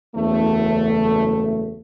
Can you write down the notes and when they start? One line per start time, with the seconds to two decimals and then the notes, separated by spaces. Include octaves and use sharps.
0.16 F#1 E2 A3